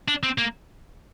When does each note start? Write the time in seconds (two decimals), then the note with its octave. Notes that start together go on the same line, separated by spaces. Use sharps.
0.08 D4
0.23 C4
0.38 A#3